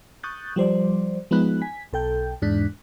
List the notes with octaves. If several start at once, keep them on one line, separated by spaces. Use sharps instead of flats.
C#6 D#6 F#6 G6 A6
F3 G3 C5 D5
F3 G#3 B3 D#4 B5 F#6
G#5 B6
B1 A4 G5 G6
E2 G#2 D4 F#6 B6